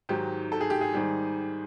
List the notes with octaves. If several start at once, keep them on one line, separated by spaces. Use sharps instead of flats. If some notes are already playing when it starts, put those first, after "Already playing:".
G#2 D#3 F#3 G4
A4
G#4
G4
G#4
G#2 D#3 G3